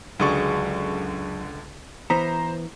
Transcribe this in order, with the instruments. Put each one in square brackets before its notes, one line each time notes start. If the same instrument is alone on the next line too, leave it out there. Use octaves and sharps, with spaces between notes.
[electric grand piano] C#2 D3 C#6 [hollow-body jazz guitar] F#2 G#4 D5
[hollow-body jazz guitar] E3 B3 [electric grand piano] C5 A#5